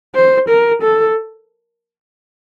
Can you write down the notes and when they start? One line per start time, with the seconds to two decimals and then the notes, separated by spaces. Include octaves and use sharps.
0.15 C5
0.49 A#4
0.82 A4